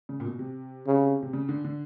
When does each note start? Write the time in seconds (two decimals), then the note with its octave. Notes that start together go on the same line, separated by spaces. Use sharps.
0.09 C#3
0.20 A#2
0.25 B2
0.39 C3
0.87 C#3
1.23 C3
1.33 C#3
1.49 D3
1.64 D3